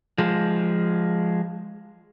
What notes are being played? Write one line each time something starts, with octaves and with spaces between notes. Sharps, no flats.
F3 G#3